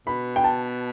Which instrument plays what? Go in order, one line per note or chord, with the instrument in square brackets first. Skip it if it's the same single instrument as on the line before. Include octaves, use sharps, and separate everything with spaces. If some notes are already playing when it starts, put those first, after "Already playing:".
[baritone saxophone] B2 [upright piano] B5
[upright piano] G5
A5